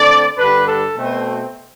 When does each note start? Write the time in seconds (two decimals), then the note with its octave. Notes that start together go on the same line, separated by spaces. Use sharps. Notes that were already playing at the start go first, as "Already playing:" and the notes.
Already playing: D3 A3 C4 D5
0.38 G2 D3 G3 D4 B4
0.67 A4
0.96 B2 A3 C4